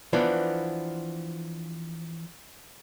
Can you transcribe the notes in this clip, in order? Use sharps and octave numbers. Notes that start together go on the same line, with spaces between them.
E3 F3 B3 D4